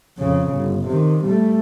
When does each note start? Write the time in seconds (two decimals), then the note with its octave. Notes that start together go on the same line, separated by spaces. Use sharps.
0.19 F2 C#3
0.55 G1
0.88 C3 D#3
1.24 G3 A3